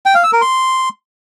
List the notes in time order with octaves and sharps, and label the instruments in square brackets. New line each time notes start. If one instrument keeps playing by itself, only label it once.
[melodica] G5
F5
E6
A#4
C6